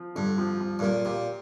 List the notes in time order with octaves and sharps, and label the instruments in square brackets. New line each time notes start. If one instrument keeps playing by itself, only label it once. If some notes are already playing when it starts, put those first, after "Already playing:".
Already playing: [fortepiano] F3
[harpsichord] G2 [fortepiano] D3
[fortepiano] F3
F3
[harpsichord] G2
[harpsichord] A#2 [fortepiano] A#3
[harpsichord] A#2 [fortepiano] G4